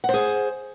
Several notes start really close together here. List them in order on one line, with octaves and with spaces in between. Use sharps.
F#5 C5 G#4